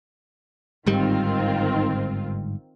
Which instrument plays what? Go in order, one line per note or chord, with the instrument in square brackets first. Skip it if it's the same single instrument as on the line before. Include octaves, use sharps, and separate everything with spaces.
[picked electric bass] G1 G#2 G3 [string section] D#3 C4 F4